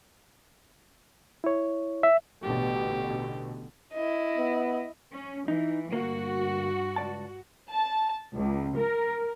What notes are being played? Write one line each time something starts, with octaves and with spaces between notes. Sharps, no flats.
E4 C#5
E5
A1 B2 D3 G4
E4 D#5
B3
C#4
E3 D#4
D2 G2 A#3 F#4
C#2 D5 A5
A5
C#2
A#4